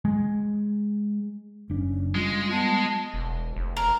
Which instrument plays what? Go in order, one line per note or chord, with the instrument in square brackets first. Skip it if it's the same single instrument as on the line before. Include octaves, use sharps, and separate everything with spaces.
[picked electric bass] G#3
[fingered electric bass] F#1 D4 [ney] C#4
[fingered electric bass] G3 [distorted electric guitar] G#3 [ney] F4
[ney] B3 [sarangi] A5
[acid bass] E1
F1
[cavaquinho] A#4